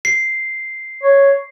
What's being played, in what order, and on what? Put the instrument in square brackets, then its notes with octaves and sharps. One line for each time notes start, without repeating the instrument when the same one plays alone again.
[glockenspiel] C7
[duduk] C#5